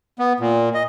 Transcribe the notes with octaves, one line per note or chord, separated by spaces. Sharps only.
B3
A#2
D#5